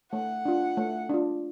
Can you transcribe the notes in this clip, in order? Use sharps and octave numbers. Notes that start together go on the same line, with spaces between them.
A3 F#5
D4 F4
A3
D4 F4